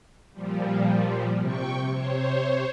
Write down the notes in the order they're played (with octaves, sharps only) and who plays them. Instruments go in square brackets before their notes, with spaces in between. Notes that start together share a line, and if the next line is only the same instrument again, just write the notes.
[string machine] A#2 F3 G3
[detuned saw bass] C3 [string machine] G5 C#6
[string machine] C5 C#5